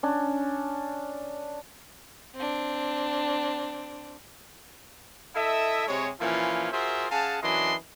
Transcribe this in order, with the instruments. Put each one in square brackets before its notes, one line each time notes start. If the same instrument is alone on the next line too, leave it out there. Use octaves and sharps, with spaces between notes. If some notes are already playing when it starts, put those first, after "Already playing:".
[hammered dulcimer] C#4 D4
[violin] C4 D4
[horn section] E4 A4 D#5 E5
C3 G#3 C#5
A#2 E3 F3 C#4 E4 F4
F4 F#4 G#4 A#4 C5 E5
C#4 G#4 F5 F#5 A5
F#2 E3 F#3 D4 D#5 C6